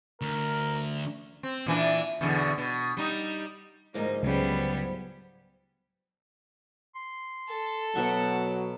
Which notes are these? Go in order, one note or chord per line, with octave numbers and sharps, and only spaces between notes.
D2 A#4
C4
A#2 E3 D4
E2 B2 D3
B2
G3 D#4
D2 G#2 F3 A#3 D#4
C#2 C#3 F#3 G3 B3
C6
A4
B2 F#3 E5 F#5 C#6